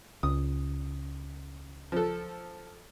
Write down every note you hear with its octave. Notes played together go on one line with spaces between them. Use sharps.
C#2 D#6
F3 A4